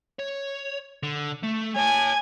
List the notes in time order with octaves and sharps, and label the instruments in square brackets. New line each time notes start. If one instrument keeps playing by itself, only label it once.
[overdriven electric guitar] C#5
D3
A3
[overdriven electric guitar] C#5 A5 [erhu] G#5